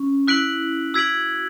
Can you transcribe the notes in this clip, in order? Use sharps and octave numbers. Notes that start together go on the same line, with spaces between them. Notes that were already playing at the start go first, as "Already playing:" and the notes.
Already playing: C#4
E4 F#6 B6 D7 F#7
F#4 E6 G#6 B6 D7 F#7